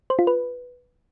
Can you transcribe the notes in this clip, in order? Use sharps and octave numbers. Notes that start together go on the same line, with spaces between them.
C5
F4
B4